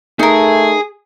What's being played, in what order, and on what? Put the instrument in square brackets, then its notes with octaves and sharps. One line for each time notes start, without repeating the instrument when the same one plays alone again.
[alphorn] A3 [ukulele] D#4 A#4 [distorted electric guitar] G#4